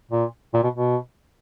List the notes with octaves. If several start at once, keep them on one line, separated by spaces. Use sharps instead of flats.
A#2
A#2
B2
B2